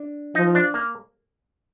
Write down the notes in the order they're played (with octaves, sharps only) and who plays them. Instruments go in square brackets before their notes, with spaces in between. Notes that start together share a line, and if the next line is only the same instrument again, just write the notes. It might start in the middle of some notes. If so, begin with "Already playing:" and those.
Already playing: [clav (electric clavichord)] D4
[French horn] F3 [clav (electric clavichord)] D#4
[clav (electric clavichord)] D4
A#3